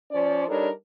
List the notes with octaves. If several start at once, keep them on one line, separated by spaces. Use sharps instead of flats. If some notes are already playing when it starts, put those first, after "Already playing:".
F3 C#4 C5 D5
G3 D4 D#4 A4 A#4 C#5